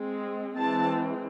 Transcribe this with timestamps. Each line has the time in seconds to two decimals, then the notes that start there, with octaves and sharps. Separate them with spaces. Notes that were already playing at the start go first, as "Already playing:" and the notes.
Already playing: G#3 C4
0.56 E3 G#3 C4 A5